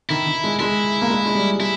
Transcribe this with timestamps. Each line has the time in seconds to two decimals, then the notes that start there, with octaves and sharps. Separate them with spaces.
0.09 D#3 E4
0.26 D#3
0.44 G#3
0.59 G#3 E4
1.02 A#3
1.10 G#3
1.26 G#3
1.35 G3
1.60 G#3 E4